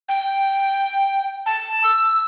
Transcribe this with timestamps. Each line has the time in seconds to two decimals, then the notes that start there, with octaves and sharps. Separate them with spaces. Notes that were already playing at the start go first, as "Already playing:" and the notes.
0.09 G5
1.46 A5
1.84 E6